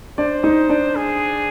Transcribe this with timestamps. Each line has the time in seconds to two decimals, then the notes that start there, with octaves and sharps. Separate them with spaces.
0.18 D4 C5 D5
0.43 D#4 D#5
0.70 D4 D5
0.96 G#4